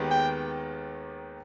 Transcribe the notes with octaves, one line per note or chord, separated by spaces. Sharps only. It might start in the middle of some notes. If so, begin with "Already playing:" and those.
Already playing: D#2 D#3 G#3 B3 G4
G5